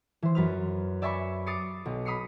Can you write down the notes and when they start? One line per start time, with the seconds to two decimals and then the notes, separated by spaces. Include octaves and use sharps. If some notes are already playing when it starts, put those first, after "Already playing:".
0.23 E3 C5
0.35 F#2 B4 F6
1.02 D5 E5 G#5 B5 C#6
1.47 D6 D#6 F6 A6 C7 C#7
1.86 B1
2.05 B5 D#6 F6 C7 C#7